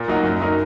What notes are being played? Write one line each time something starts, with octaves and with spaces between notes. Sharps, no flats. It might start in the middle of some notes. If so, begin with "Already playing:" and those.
Already playing: A#2
F#3 A#3 D#4 F#4
F#2
F#3 D#4 A#4